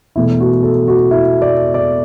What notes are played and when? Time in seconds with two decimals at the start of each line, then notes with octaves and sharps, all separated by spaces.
0.16 E1 E2 B2 A3 E4
0.40 F#4
0.63 A4
0.88 F#4
1.11 E4
1.42 D5
1.74 D5